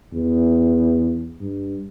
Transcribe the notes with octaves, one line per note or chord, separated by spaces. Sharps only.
E2
G2